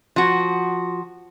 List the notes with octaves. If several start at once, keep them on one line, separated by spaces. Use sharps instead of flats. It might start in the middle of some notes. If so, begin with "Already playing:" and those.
F3 F#4